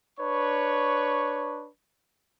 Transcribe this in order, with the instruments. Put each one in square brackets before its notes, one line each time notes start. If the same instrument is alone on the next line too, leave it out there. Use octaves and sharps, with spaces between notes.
[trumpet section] D4 B4 C#5 C#6